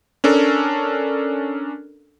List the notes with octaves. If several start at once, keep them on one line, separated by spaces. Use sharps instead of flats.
C#4 D4 A4 A#4